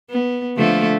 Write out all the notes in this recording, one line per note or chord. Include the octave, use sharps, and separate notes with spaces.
B3
D3 F3 A3